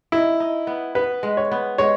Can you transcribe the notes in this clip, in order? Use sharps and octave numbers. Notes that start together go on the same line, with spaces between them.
D#4 E4
D#4
B3
B3 B4
G#3
C#5
B3
G#3 C#5